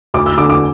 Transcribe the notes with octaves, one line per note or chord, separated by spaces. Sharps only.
D2 D6
E6
D3 D6
D6